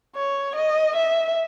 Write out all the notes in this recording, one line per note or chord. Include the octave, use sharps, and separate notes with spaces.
C#5
D#5
E5